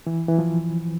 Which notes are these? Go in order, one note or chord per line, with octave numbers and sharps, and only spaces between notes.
E3
E3
F3